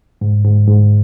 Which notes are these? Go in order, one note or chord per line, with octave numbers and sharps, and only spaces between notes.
G#2
G#2
G#2